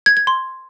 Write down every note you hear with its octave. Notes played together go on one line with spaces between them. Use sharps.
G#6
G#6
C6